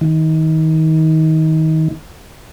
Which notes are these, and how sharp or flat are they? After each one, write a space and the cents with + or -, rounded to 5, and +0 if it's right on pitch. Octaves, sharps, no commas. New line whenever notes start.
D#3 +30